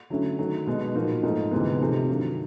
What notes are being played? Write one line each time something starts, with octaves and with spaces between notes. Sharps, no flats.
D3 F#3 A3 C#4 E4
D#3 F#3 A3
B2 G#3 B3 D4
A#2 F3 A#3 D#4 F#4
G#2 F3 A3
D2 C3 E3 G#3 B3
C3 F3 A3 C4 D#4
G2 D#3 F#3